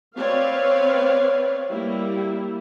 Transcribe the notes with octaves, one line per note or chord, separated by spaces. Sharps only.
C4 B4 C#5 D5 F5
G3 A#3 E4